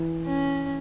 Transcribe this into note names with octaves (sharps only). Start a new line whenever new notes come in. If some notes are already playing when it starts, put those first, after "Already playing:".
Already playing: E3
C#4